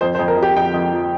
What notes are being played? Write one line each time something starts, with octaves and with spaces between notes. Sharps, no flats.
F2 C5
C5
F2
A#4
F2
G4
F2 G5
F2
F3